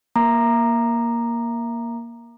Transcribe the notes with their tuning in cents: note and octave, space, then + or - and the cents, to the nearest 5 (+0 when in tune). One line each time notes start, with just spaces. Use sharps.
A#3 +10 A#5 +0 D6 +35